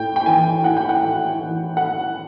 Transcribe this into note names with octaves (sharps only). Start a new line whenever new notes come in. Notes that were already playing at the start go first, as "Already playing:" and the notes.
Already playing: A2 G5
G5
E3 G#5
A2 F#5
G5
F#5
A2
E3
A2 F#5